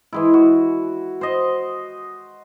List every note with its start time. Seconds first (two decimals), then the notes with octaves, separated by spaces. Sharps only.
0.13 E3 G#3 E4
0.34 F#4
1.21 C5 D#5